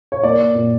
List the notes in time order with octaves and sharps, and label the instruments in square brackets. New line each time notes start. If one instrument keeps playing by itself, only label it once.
[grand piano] C#5
A#3 D5
A#2